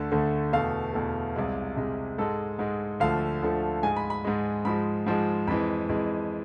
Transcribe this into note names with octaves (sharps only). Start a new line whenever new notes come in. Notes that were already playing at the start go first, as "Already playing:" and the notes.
Already playing: D2 D3 A3 A5
D2 D3 A3
E2 B2 A3 F5
E2 B2 A3
C2 C3 G#3
C2 C3 G#3
G#2 G#3 A4
G#2 G#3
D2 D3 F3 A3 F5
D2 D3 F3 A3
G#2 G#3 G#5
B5
B5
G#2 G#3
G#2 F3 G#3 B5
G#2 F3 G#3
F2 E3 G#3 B5
F2 E3 G#3